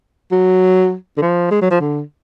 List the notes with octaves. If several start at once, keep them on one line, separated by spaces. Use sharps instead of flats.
F#3
D3
F3
G#3
F#3
F3
D3